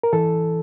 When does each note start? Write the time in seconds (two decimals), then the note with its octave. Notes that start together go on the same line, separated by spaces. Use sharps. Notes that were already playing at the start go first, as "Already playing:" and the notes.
0.03 A#4
0.13 E3 A4